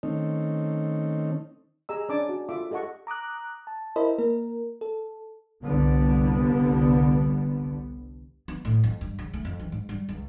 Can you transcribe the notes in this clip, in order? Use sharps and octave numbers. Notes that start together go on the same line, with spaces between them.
D#3 A3 C4 C#4 D#4
G4 G#4 D#5 A#5 E6
C#4 D4 G#5 A5 D6
F#4
F4 A4 E5 D6
G4 A4 D#5 F#5 C#6
A#5 D6 D#6 F#6
A5
E4 A#4 C5 D#5 E5 B5
A#3 A#4
A4
G1 C2 D3 G3 B3
B3
A2
F2
G2
C#3
A3
F2
E3
G#2
G3
C#2